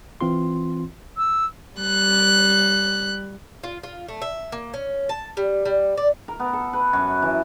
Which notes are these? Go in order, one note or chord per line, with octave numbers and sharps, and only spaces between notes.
E3 C4 F4 C6
E6
G3 F#6
F4
F4
A3
E5
A#3
C#4
A5
G3
G3
D5
A#4
B3
A4
B4
F#2
E3